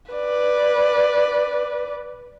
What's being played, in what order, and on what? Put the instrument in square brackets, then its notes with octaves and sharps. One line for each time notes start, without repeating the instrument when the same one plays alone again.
[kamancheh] B4 D5